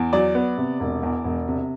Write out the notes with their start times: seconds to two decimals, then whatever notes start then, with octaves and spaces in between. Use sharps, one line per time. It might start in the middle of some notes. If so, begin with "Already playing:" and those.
Already playing: E2
0.13 F#3 D5
0.35 B3
0.57 C3
0.80 E1
1.03 E2
1.24 E1
1.48 C3